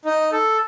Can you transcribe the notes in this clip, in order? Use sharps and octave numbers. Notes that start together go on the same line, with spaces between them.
D#4
A4